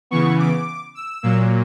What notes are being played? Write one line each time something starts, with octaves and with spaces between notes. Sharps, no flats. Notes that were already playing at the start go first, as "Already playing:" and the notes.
C#3 E3 B3 C#6
D6
E6
A#2 F#3 A#3